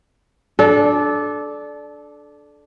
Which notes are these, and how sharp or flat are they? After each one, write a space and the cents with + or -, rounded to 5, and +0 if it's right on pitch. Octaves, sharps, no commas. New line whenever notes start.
D4 +0 A4 -25